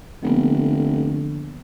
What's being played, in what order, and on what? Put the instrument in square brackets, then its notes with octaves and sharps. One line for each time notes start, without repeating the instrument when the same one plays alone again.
[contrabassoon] F1 [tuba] D3 [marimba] F3 A#3 B3